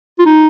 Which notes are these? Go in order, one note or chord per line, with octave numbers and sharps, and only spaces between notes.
F4
D#4